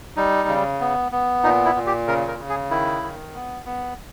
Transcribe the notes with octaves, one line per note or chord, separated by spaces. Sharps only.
G3 D#4
C#3
B3
B3
A#2 D#4
E4
A#2
G4
C#3 A#4
A#4
C#3
G#4
D#3 E4
D#3
B3
B3